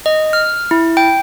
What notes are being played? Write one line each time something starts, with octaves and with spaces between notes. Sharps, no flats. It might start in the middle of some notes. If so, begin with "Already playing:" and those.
D#5
F6
E4
G5